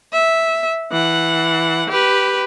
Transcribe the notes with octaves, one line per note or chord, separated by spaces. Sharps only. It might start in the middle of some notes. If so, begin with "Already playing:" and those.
E5
E3 F#5
G4 B4